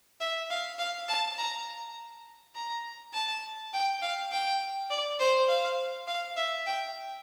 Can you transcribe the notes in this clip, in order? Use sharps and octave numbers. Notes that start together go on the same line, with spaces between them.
E5
F5
F5
A5
A#5
A#5
A5
G5
F5
G5
D5
C5
F5
F5
E5
G5